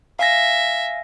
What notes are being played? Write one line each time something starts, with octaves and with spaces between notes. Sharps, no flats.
E5 F5 G#5 A#6